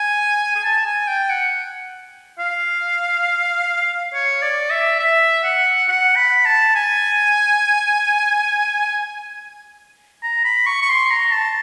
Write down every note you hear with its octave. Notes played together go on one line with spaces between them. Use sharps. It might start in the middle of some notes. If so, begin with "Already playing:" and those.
Already playing: G#5
G#5
A5
G#5
G5
F#5
F5
C#5
D5
E5
E5
F#5
F#5
B5
A5
G#5
A#5
B5
C#6
C#6
C6
A#5
A5